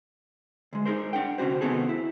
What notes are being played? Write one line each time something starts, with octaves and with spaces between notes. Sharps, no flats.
D2 G#3
D#4 G#4 A#4 C5
D4 F#5 G5
D2 C3 C#4 F#4 C5
C3 D#3 B3 C4 G#4 A4
E4